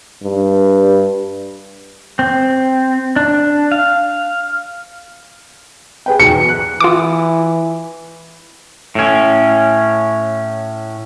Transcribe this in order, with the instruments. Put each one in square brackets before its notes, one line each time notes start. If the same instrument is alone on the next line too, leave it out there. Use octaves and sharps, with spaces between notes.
[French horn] G2
[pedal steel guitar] C4
D4
F5
[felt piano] G#4 B4 G5
[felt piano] B1 E2 F#4 [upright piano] C#7
[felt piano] F#6
[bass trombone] E3 [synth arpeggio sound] F4 D6
[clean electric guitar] A2 C#4